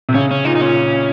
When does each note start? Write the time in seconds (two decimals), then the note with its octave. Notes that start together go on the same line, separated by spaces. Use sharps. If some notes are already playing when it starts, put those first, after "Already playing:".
0.09 C3
0.14 C#3 C#4
0.31 C#4
0.45 A#2 D#4
0.56 D#4
0.61 A#2 C#4